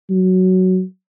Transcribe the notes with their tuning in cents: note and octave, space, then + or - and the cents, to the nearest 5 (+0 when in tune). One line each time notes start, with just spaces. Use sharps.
F#3 +5